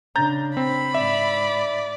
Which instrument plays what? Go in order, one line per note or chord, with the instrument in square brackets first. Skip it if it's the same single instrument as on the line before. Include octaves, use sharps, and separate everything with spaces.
[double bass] C#3 D4 [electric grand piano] A#5 G6 A6
[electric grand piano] C4 [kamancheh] B5
[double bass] G#2 [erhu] D5 [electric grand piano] E5